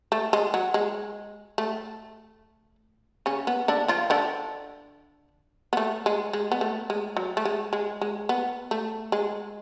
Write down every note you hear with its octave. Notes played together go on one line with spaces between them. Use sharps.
A3
G#3
F#3
G#3
A3
C#3 C#4
B3
D3 D4
F3 F4
D3 D4
B3
A3
G#3
G#3
B3
A3
G#3
F#3
A3
G#3
G#3
G#3
B3
A3
G#3